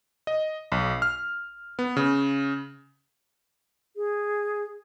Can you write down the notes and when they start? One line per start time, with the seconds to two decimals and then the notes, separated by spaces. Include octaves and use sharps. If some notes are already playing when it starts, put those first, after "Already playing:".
0.27 D#5
0.72 B1
1.02 F6
1.79 B3
1.97 C#3
3.97 G#4